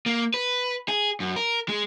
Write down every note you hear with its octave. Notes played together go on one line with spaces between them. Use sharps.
A#3
B4
G#4
F#2
A#4
G#3